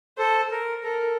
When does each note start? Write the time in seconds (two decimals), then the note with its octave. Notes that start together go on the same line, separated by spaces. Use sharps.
0.18 A4 C5
0.51 A#4
0.83 A4 A#4